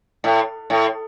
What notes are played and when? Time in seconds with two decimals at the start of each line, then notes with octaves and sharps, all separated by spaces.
0.24 A2
0.70 A2